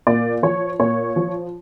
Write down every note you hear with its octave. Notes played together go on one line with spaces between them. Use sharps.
A#2 D5
F3 C#5
A#2 C#5
F3